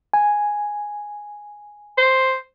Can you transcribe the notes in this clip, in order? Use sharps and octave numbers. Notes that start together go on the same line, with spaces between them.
G#5
C5